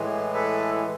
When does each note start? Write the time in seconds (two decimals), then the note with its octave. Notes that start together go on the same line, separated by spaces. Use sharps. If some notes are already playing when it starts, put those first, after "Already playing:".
Already playing: A2 E3 G#3
0.34 A4 B4